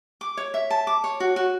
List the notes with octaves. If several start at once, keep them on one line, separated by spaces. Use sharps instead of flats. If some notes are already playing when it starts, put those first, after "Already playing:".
D6
C#5
E5
A5
D6
C#5
F#4
F#4